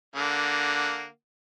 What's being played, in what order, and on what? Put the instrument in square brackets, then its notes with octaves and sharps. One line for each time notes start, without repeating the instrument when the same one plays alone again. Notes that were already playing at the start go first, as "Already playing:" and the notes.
[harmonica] D3 A#3 F#5